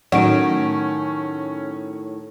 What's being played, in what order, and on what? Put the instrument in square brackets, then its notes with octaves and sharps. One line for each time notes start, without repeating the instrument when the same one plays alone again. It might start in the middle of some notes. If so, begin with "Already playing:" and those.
[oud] A2 [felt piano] D#3 F#3 D#4 [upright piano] C#4 [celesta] F#5 D7